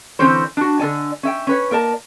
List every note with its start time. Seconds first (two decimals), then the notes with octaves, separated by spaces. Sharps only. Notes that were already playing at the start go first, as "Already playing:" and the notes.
0.19 D3 E3 C4 C#4 C5
0.57 D4 F#4
0.80 D3 A4 D5 G#5
1.23 C#4 E5 G5
1.47 C#4 B4 C#5
1.71 A#3 A#4 D5 A5